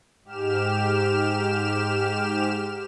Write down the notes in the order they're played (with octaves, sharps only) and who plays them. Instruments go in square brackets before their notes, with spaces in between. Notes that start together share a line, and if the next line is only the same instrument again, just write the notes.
[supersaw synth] G#2 G4 F6 E7